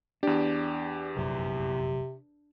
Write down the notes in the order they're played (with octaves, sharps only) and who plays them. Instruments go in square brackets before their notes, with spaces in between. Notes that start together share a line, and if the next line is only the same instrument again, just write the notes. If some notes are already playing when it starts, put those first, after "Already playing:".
[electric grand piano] E2 G4 [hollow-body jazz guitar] D4
[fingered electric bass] F1 A#1 F#2 [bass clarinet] C3